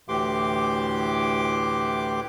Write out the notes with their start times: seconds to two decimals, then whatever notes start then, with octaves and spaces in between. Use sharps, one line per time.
0.09 D2 A2 E3 G4 C6 D6